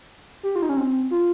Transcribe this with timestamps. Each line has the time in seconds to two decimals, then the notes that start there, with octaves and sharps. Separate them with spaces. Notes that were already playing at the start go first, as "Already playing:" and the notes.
0.43 G4
0.56 F4
0.62 D#4
0.69 C#4
0.77 C4
1.11 F4